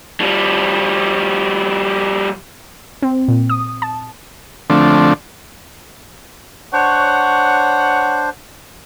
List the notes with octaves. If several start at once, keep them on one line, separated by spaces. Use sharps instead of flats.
F3 G3
C4
A#2
D#6
A5
D3 F3 A3 C4 D4
D4 C5 C#5 F#5